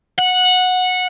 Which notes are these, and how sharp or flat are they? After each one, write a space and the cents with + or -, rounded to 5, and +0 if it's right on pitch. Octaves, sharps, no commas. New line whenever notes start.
F#5 -15